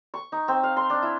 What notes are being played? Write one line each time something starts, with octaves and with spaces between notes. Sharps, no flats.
C#6
D#4
C4
F5
C6
D4
E4